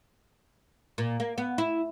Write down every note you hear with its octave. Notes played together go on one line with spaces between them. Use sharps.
A#2
A#3
B3
E4